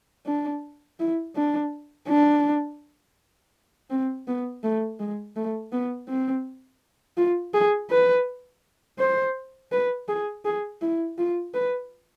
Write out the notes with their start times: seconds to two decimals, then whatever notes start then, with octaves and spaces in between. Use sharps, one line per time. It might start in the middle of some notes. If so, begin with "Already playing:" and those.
0.26 D4
1.00 E4
1.35 D4
2.08 D4
3.90 C4
4.27 B3
4.64 A3
5.00 G#3
5.36 A3
5.72 B3
6.08 C4
7.17 F4
7.54 G#4
7.90 B4
8.99 C5
9.72 B4
10.08 G#4
10.45 G#4
10.81 E4
11.18 F4
11.54 B4